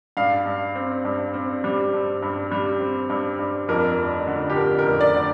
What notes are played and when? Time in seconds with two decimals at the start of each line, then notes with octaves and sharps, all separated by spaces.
0.17 G2 F5
0.46 G2
0.75 C4
1.05 G2
1.34 C4
1.64 G3
1.93 G2
2.23 G2
2.52 G3
2.80 C4
3.10 G2
3.39 G2
3.68 F2 A#4
3.98 F1
4.27 D3
4.50 G4
4.56 D3 A#4
4.79 A#4
4.86 F1
5.01 D5
5.15 D3